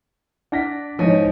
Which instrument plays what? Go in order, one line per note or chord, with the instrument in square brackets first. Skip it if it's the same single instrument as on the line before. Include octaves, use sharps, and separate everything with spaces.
[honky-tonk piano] D4 [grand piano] F#5 A#6 B6
[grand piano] G#2 E3 [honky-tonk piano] F3 A#6 [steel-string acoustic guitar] C#4 [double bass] D#4